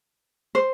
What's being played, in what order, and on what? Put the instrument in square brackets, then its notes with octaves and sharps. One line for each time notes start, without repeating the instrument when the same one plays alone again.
[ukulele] C5